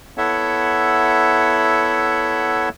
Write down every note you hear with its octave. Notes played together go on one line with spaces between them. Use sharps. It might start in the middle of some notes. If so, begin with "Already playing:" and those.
B3 E4 A4 C#5 E5 F#5